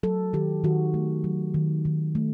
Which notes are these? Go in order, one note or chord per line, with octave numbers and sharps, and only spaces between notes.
F#3 A4
D#3 G4
D#3 F#4
A3
F#3
D#3
D#3
A3